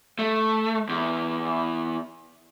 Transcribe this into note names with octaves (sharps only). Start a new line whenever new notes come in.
A3
E2